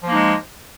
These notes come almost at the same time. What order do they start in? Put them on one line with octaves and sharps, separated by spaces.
F3 A#3 D#4 G#3